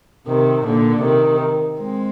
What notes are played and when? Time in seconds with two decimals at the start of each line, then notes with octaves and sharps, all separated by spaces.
0.27 C3 D#3
0.66 A#2 D3
1.04 C3 D#3
1.79 G#3 C4